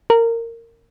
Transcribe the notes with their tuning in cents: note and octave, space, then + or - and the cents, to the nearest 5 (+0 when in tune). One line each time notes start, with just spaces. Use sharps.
A#4 -20